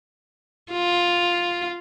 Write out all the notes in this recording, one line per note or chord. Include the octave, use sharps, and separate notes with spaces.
F4